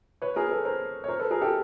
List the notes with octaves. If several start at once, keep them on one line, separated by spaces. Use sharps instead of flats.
B4 C#5
G#4 A#4
A4 B4
A#4 C5
C#5
A#4 C5
A4 B4
G#4 A#4
G4 A4